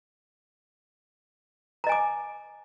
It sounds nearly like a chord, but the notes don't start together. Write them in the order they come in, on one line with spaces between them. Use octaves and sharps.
A#5 D#5 G#5 D6